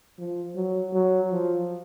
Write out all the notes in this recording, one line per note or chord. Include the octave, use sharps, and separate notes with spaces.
F3
F#3
F#3
F3